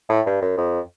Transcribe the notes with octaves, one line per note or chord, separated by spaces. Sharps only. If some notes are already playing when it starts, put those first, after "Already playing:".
A2
G2
F#2
F2